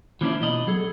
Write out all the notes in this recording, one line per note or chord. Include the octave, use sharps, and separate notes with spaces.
E3 F3 A#3 C#4 D4 E4
B2 D#5 A#5 B5
F#3 G#4 A4